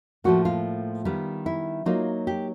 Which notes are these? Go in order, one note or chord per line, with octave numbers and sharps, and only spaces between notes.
A2 F3 A#3 F#4
F4
D#3 G3 B3
E4
F#3 A#3 D#4 F4
G4